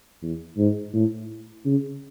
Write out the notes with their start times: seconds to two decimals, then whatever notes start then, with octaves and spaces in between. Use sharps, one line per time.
0.22 E2
0.58 G#2
0.94 A2
1.65 C#3